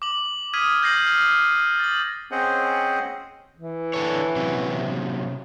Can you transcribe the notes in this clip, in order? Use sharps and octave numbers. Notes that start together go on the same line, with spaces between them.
D6 F#7
D#6 F6 G#6 B6 D#7
G6 A#6 C7 F#7
F6
F6
A6 F#7
C4 C#4 G#4 C5 D#5 F#5
E3
D3 A4 C#5
C3 F#3 C#4